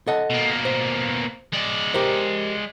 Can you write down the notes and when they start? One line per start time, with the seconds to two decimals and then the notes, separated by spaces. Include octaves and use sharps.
0.07 A4 D#5 F#5
0.30 B2 A#3
0.65 C5
1.53 G#3 D5
1.94 G4 A#4 C5